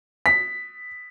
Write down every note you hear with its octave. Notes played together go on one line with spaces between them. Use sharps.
B6